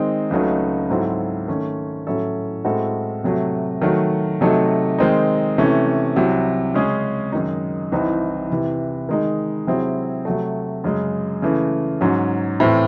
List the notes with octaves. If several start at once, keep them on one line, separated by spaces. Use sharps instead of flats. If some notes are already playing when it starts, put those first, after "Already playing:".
Already playing: D#3 G#3 C4 D#4
C#2 C#3 F#3 A3 D#4
G#2 F#3 C4 E4 A4
D#3 A3 C#4
A2 F#3 C#4 E4 A4
A2 G#3 C4 F#4 A4
C3 F#3 A3
D#3 F#3 A3
C3 F#3 A3 D#4 A4
D#3 G#3 C4 D#4
C3 E3 A3 C#4
C2 C3 F#3
C#3 G#3 C#4 G#4
F#2 D#3 G#3 D#4
C2 C3 E3 C4 D#4
E2 C3 E3
D#3 G#3 D#4
C3 F#3 C4 E4 G#4
C3 F#3 A3
F#2 C#3 G#3
C#3 E3 A3
G#2 F#3 C#4
A2 E3 C4